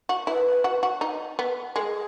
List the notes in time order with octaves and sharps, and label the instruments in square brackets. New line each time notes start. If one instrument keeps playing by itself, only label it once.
[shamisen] F#4
[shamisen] E4 [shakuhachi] B4
[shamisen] F#4
F#4
D#4
B3
[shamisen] G#3 [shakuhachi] A#4
[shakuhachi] G#4